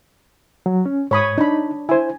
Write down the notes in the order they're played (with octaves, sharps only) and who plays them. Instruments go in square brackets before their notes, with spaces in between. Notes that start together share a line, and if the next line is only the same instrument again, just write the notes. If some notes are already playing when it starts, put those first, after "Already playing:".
[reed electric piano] F#3
C#4
[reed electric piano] G#2 [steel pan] C#5 B5 D#6
[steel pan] D4 B5 [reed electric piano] D#4
[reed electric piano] E4 C5 [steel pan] G#5